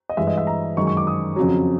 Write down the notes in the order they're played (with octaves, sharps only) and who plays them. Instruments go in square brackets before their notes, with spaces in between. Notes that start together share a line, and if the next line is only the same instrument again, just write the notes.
[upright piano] D#5
G2 E3 G#3 E5
D#5
E5
A#5
F#2 D#3 G#3 C#6
C#6
D6
D#6
F2 C#3 F#3